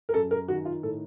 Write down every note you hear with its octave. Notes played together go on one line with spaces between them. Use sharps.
A#4
F#2 A4
A#4
D#3 F#4
F4
A2 A4